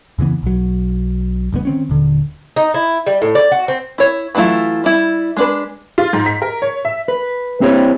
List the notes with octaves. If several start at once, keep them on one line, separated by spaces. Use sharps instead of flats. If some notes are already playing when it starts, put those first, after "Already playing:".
F2 C#3 E3 B3
B1 F#3
F#1 G2 C3 B3
D#3 C4 C#4
D#1 D3
D#4
E4
G3
A2
D5
F#4
C4
E4 C#5
E3 F#3 A3 E4 F4
G3 E4
G#3 D4 B4
F4
G#2
B6
A#4
C#5
E5
B4
C4 E4 G4 C5 C#5